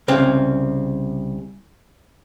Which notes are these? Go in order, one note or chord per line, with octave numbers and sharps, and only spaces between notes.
C2 C#3 C4 F5